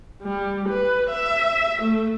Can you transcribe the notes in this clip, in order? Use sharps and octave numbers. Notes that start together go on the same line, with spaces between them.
G3
B4
E5
A3